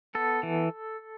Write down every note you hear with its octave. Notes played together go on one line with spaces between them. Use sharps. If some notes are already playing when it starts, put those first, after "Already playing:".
B3 A4
E3